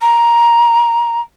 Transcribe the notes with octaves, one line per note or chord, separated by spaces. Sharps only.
A#5